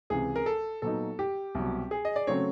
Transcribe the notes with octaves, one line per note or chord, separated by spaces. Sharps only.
C#2 C3 E3 G#4
A#4
A4
A#2 F#3 B3 D#4 A4
G4
C2 B2 F#3
G#4
D#5
D5
C#3 F#3 A3 C4 C#5